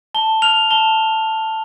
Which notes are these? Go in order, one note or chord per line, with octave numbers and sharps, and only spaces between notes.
A5 G7
F6 F7
A5 G7